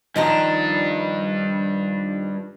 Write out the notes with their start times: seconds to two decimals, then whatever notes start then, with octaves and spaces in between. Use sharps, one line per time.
0.16 G2 D#3 F3 D4 A#5